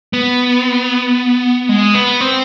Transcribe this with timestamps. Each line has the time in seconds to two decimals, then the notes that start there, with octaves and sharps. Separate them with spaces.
0.13 B3
1.69 G#3
1.95 B3
2.21 C4